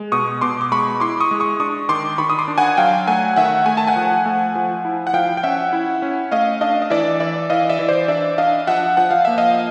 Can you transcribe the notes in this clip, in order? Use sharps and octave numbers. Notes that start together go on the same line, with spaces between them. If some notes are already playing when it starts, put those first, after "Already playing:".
Already playing: G#3
B2 C#6 D#6
B2 C6 D6
D6
G#3 B5 C#6
E4 C6 D6
C#6 D#6
G#3
C#6 D#6
D4 C#6 D#6
D#3 C6 D6
D#3 B5 C#6
D#6
C6 D6
D4
F#5 G#5
F#3 F5 G5
A3 F#5 G#5
D#3 E5 F#5
A3 G#5
A5
F#5 G#5
F3
A3
F3
E4
F#5
F3 F5 G5
G5
C#4 E5 F#5
E4
C#4
A3 D#5 F5
D4 D#5 F5
D#5
E3 D5 E5
E3 D5 E5
E3 D#5 F5
D5 E5
E3
C5 D5
D4 D5 E5
D4 D#5 F5
F3 E5 F#5
F3 F#5
F5
A#3 E5
D#5 F5